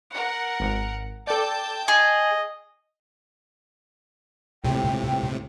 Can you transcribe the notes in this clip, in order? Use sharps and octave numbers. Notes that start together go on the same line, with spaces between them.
A#4 F#5
G#1
A4 D5 G5 A5 G6
G#4 D#5 G#5
C#2 A2 C3 G5